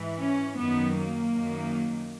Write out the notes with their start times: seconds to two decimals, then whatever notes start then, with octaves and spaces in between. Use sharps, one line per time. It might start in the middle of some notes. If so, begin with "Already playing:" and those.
Already playing: G#2 E3
0.18 C#4
0.56 F#2 D#3 F#3 B3
0.95 A#3
1.33 F#2 D#3 F#3